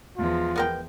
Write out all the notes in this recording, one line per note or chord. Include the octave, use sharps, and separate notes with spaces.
E2 F3 G#3 F4
B3 A#4 G5